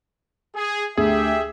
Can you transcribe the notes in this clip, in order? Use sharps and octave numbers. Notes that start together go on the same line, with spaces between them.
G#4
D2 G4 G#4 E5